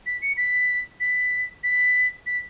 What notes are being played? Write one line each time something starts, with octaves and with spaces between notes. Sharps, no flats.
B6
C#7
B6
B6
B6
B6